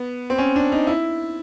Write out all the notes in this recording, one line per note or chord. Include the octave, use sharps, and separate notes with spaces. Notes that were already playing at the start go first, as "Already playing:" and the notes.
Already playing: B3
C4
C#4
D4
D#4
E4